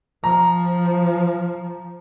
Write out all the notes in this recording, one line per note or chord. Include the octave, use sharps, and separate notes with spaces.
F3 A#5